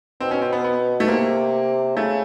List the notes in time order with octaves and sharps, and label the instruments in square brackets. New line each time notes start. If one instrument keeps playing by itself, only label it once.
[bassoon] B2 [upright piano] C4
[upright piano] C#4
C4
B3
B3
A3
[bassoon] C3 [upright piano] A#3
[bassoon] C#3 [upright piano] A3